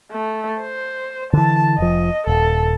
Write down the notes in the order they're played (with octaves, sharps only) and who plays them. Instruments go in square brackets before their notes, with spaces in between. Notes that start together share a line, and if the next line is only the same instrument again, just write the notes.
[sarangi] A3
C5
[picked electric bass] D3 E3 [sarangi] A5
[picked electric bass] F1 F3 [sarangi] D#5
[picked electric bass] D#1 [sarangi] A4